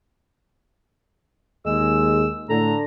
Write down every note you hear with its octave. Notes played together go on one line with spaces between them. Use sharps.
D#2 G#3 E6
A2 D3 A#5